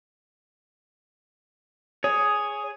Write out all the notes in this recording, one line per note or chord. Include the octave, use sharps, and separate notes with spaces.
G#4 C#5